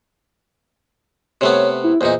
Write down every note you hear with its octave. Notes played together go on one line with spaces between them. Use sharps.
C3 A3 B3 C#5
E4
E2 A#2 D#4 C5